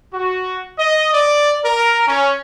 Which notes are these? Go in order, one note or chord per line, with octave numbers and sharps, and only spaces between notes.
F#4
D#5
D5
A#4
C#4